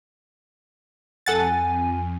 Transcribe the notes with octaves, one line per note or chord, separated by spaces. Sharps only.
F2 A4 F#5 G#5 A6